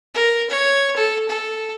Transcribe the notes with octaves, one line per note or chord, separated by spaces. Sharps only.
A#4
C#5
A4
A4